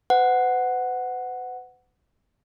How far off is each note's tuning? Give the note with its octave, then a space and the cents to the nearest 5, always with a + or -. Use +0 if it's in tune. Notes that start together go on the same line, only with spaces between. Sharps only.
B4 +45 F#5 +0